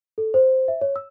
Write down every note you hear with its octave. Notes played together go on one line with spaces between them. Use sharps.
A4
C5
E5
C#5
E6